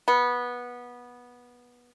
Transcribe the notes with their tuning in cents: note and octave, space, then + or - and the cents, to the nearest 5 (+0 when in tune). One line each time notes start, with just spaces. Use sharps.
B3 -15